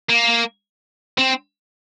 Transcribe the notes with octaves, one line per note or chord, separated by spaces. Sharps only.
A#3
C4